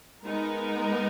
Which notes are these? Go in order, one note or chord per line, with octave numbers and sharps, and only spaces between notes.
G#3 B3 D#4 A#4